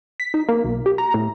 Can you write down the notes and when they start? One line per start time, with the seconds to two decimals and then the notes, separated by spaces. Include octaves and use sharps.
0.20 B6
0.34 D#4
0.49 A#3
0.64 B1
0.86 G4
0.98 A#5
1.14 A2